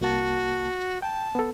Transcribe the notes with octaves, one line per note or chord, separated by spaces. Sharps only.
C2 A#3 F#4 A5
G5 A5
B3 A4